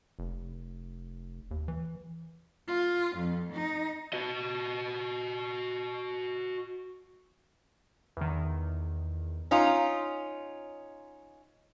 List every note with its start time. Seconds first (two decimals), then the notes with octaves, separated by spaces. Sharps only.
0.19 F1
1.51 D#2
1.68 E3
2.67 F4
3.16 F2
3.53 D#4
4.13 F#4 D#5
8.17 E2 D#3
9.51 C#4 D#4 F4